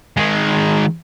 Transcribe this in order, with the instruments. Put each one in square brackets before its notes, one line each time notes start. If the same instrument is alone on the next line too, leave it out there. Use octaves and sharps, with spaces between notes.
[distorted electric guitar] D#3 G#3